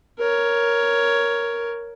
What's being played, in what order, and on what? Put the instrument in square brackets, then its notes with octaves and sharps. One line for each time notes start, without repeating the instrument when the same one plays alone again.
[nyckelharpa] A#4 C#5